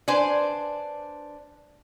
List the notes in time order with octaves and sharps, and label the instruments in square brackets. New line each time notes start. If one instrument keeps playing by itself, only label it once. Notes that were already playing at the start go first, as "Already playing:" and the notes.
[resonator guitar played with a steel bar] D4 B4 C5 G#5